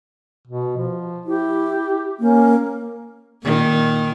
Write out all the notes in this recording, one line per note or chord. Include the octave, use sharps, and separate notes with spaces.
B2
F3
E4 G4
A#3 C#4
A#2 D#3